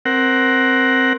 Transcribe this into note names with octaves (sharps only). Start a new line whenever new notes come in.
C4 A#4 F#5